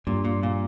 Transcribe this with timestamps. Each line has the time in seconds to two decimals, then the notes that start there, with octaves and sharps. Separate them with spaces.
0.07 G2 A#2
0.25 A#2
0.43 A#2